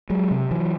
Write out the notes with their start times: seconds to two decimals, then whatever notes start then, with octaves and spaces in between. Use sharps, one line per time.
0.10 F#3 G#3
0.31 C3
0.51 E3 F#3